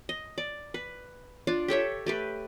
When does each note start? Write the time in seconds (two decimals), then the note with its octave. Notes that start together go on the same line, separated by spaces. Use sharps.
0.09 D#5
0.38 D5
0.74 B4
1.47 D4 F4 D5
1.68 G4 A4 C#5 E5
2.06 A3 G4 B4